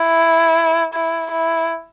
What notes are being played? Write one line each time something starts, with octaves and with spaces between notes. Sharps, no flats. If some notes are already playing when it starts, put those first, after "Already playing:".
Already playing: E4
E4
E4